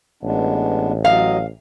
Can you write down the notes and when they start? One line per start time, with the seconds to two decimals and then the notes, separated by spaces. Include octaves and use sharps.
0.23 A1 G#3 B3 D4
1.05 F#3 D#5 F5